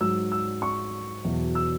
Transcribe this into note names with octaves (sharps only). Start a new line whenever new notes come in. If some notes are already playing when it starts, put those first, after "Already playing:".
G#2 F#3 E6
E6
C#6
E2 B2 F#3
E6